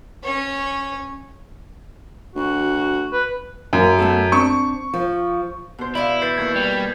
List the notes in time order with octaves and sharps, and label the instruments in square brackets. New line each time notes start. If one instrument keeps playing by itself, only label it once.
[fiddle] C#4 C#5
[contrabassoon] D2 [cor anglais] F#4
[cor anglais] B4
[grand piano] F#2 [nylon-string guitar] A#3
[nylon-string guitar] A3 B3 A4
[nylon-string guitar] C4 D4 [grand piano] C#6
[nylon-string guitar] F3
[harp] B2 C5
[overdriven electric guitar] E4 [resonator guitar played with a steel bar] D5 D#5 F5
[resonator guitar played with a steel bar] E3 [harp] B4 [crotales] G6 A6 C7
[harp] D#2 C#6 E6 [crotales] G#6
[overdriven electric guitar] G3
[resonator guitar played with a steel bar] E3 G#4